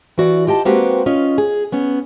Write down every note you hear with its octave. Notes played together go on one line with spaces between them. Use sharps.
E3 F#4 D5
F4 G4 D#5 A5
G#3 A#3 C4 F#4 G4 B4
C#4 F4 D#5
G#4
B3 C#4